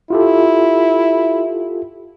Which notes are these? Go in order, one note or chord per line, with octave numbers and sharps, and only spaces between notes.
E4 F4 G4 A4